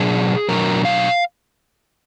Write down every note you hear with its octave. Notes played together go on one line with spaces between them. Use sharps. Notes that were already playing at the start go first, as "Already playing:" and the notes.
Already playing: B2 F#3 D4 G#4
B2 F#3 D4 A#4
F5